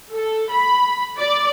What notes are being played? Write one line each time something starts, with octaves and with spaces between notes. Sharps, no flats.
A4
B5
D5